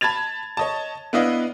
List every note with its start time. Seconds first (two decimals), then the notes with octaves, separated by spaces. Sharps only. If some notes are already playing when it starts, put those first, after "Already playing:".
0.01 A5 B5 G#6 A6 F7
0.57 C#5 D#5 A5
1.13 B3 D4 E4 B4 D#5 F5